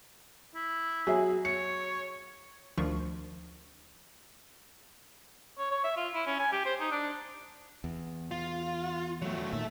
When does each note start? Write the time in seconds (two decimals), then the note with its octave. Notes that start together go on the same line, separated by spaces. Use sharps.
0.55 E4
1.07 F#3 G#4 E5
1.45 C#5 C#7
2.78 D2 D#3 F3 D4 C#6
5.58 C#5
5.71 C#5
5.84 E5
5.97 F4
6.14 E4
6.27 C#4
6.39 G#5
6.52 G4
6.66 C5
6.80 D#4
6.92 D4
7.84 E2
8.31 F4
9.22 F#3 A3
9.53 A#2 D#3 A4 E5